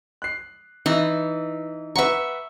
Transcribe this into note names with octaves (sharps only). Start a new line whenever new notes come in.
F#6 C7
E3 D#4
B4 E5 F#5 A#5 C#6